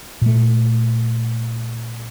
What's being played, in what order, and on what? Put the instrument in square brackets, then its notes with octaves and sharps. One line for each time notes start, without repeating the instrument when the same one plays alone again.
[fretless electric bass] A#2 A3